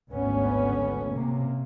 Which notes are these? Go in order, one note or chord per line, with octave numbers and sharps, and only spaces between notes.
G#1 D2 B3 C#4
C3 A#3